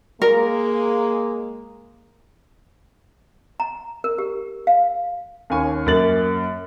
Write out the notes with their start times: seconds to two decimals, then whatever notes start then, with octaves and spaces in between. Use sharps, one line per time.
0.22 G#3 A#3 A#4
3.60 A#5
4.04 A#4
4.18 G4
4.67 F5
5.50 D#2 C#4 G#5 C#6
5.86 F#2 A#3 A6 F#7